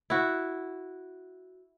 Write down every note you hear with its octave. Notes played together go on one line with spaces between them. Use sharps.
E4 F#4